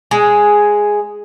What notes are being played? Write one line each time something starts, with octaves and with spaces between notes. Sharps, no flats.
G#3